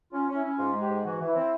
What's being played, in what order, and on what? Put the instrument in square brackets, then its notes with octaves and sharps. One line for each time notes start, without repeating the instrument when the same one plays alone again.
[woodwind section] C#4 [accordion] F4
[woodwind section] C#4
[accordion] E4
[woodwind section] C#4
[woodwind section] G#2 [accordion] F4
[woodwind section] G#3
[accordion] G4
[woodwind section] G#2
[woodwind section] E3 [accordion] F#4
[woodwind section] E3
[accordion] E4
[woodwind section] C4